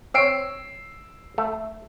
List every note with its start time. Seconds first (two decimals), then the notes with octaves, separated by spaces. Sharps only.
0.14 C4 C#5 E6 C7 D7
1.38 A3